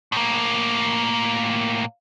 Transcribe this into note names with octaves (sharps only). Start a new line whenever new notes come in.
A2 A#3